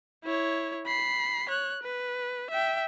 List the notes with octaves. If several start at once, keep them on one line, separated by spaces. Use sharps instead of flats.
E4 C#5
B5 C7
C#5 F#6
B4
E5 G5